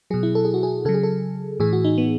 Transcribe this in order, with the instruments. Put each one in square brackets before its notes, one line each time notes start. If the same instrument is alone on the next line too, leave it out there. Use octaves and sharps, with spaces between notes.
[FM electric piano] B2 F#3 G#4
E4
A4
G#4
F#4
G#4
C#3 F#3 A4
G#4
A4
A2 E3 G#4
F#4
D#4
B3